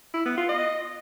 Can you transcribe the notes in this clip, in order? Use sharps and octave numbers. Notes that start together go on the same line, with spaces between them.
E4
B3
F4
D#5